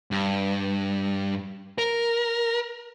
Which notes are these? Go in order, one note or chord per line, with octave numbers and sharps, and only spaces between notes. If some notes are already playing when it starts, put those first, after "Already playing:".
G2
A#4